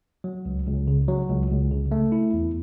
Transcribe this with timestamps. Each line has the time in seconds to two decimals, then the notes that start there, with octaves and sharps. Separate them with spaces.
0.24 F#3
0.45 C#2
0.67 C#2
0.88 C#3
1.08 F#3
1.29 C#2
1.50 C#2
1.71 C#3
1.91 A3
2.12 E4
2.33 E2